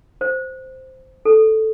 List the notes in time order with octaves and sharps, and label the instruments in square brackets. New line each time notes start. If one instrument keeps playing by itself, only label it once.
[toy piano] C5
A4